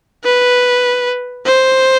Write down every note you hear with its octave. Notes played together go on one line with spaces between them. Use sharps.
B4
C5